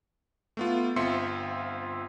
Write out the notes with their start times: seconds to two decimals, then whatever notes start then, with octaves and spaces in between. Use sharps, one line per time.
0.57 A3 B3 F4
0.96 G1 C4 F4 E5 C6 C#7